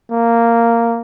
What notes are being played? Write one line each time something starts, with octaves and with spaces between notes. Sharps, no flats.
A#3